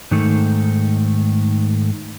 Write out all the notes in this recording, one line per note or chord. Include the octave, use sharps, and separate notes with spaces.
G#2 D#3 A3